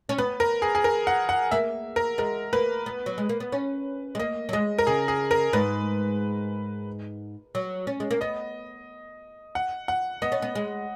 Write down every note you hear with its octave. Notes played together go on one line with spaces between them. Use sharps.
C#4
B3 B4
A#4
G#4
G#4
A#4
F#5
F#5
A#3 E5
A#4
G#3 A#4
A#3 B4
B3
F#3
G#3
A#3
B3
C#4
G#3
A#3 D#5
F#3
G#3 D#5
A#4
C#3 G#4
G#4
A#4
G#2 B4
F#3
C#4
G#3
A#3
B3 D#5
F#5
F#5
B3 D#5
C#4
B3
G#3